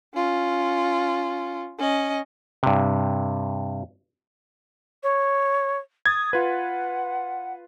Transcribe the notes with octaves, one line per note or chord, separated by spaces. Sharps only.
C#4 F4
C#4 D#5
G2 C3
C#5
D#6 G#6 A6
F4 B4 F#5